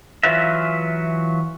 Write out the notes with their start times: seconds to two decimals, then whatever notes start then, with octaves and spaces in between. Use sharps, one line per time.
0.23 E3 F#3 F4 B4 E5